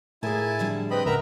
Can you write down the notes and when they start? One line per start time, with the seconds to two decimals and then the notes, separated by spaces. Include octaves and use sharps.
0.23 A2 E4 F4 G#4 A#4 G#5 A5
0.59 D3 F3 G3
0.90 C4 B4 D#5 B5
1.06 C#2 G#2 A#4 B4 E5 F#5 A#5